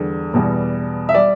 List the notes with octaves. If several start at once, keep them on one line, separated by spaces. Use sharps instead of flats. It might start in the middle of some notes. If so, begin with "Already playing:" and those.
Already playing: E2 D3 G3
E2 B2 G3
E5
G3 D5